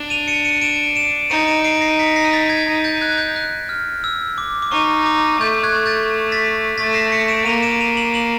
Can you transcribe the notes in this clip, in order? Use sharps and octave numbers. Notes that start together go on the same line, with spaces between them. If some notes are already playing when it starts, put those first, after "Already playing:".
Already playing: D4
D#7 F7
C#7 D#7
C#7 D#7
D7 E7
D7 E7
D#4 C#7 D#7
D7 E7
C7 D7
A#6 C7
B6 C#7
A#6 C7
A6 B6
G#6 A#6
D#4
G6 A6
F#6 G#6
G6
F#6
F6
E6
D6
D6
D#4 C#6
D6
A3 G6
F#6 G#6
G6 A6
A6 B6
A3 A6 B6
A#6 C7
B6 C#7
D7 E7
A#3 D#7 F7
D7 E7
D#7 F7
E7 F#7
E7 F#7